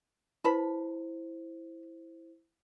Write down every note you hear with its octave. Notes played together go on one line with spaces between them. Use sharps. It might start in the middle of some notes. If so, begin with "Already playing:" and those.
E4 B4 C5 A5 B5